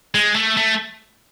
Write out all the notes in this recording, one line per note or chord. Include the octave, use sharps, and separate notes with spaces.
G#3
A3
A3